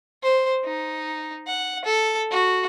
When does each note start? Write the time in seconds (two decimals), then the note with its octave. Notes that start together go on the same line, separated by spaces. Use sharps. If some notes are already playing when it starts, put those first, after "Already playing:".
0.23 C5
0.65 D#4
1.47 F#5
1.85 A4
2.31 F#4